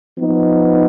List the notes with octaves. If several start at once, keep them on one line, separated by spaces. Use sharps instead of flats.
F3 B3 D#4